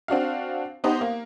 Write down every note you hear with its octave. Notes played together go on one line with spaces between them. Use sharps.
C4 D4 F#4 F5
B3 D#4 G4 C5
A#3